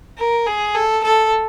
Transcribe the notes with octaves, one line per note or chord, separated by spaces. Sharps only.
A#4
G#4
A4
A4